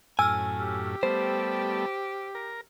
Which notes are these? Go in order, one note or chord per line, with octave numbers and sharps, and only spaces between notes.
F#2 A2 G#5 E6 F6
G4
G3 A3 B3 C5
A#4